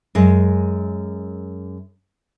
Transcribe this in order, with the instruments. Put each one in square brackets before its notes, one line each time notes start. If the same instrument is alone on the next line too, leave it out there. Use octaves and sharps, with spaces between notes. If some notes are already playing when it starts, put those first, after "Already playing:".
[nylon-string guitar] F#2 G#3